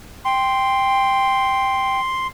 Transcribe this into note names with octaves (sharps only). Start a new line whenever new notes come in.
G5 C6